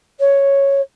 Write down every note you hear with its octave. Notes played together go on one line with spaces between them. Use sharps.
C#5